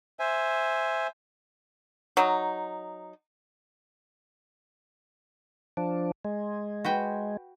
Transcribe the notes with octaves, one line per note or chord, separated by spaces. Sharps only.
C5 E5 G#5
F#3 D#4
F3 D4
G#3
F#4 B4 G5